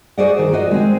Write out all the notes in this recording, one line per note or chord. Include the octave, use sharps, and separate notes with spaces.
F#4 G#4 C5 D5 D#5 F#5
D#3
F4 F#4 D#5
G#3 C4